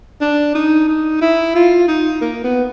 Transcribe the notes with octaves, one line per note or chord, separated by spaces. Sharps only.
D4
D#4
D#4
E4
F4
D#4
A#3
B3